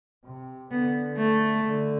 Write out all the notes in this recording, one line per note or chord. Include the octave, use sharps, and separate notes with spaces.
C3
D3 B3
A3
D3